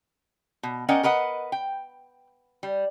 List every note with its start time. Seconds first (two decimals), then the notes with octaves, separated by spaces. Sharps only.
0.63 B2
0.89 C#4 A#4 D5 D#5 F#5 G5
1.03 A#4 B4 D#5 F#5
1.52 G5
2.63 G3